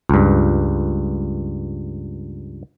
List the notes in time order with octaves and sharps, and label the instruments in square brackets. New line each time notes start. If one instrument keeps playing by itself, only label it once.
[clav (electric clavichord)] C#2 G2